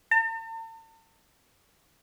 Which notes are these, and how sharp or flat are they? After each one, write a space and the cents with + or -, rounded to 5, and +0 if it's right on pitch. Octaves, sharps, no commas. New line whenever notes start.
A5 +45